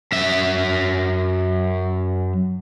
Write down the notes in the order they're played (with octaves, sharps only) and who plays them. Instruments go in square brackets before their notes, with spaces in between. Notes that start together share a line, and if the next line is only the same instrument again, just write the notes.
[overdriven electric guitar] F#2 E5